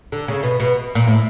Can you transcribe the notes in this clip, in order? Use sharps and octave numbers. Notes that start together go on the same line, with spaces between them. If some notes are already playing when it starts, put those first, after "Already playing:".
D3
C#3
B2
B2
A#2
A2